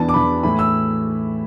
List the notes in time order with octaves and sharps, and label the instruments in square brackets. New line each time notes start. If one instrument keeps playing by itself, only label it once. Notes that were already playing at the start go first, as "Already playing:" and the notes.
Already playing: [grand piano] E2 E3 B3 D4 A5
D6
E2 E3 B3 D4 B5
A2 E3 A3 E4 B5
E6